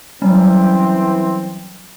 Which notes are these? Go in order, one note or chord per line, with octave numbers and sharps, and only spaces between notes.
E3 F#3 G3 C4 C#4